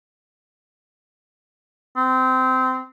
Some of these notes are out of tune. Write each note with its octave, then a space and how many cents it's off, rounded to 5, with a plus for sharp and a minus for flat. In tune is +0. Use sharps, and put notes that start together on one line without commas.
C4 -20